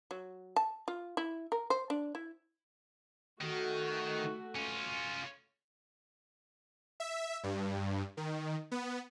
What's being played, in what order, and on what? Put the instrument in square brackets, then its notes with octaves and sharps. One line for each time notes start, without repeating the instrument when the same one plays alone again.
[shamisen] F#3
A5
F4
E4
A#4
C5
D4
E4
[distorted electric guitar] D#3 [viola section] A3 F#4
[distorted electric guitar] C#4 F4
[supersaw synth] E5
G2
D#3
B3